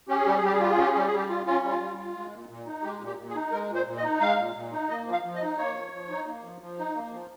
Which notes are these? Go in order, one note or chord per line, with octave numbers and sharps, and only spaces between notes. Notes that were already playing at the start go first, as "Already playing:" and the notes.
C#4 G4
G#4
G3 G4
G#4
G3 G4
G#4
F4 G4
G#4
C#4 G4
G#4
G3 G4
G#4
G3 G4
F4
C#4 F4
G3
F4
G3
F4
G#3
A#2
A#2
D#4
G#3 G4
A#2
G4
A#2
G#4
D#4
G#3 A#4
A#2
C5
A#2
D#5
D#4
G#3 F5
A#2
A#2
D#4
A#3 D#5
F3
F5
F3
D#5
D#4
A#3 C#5
F3
F3
D#4
A#3
F3
F3
D#4
A#3
F3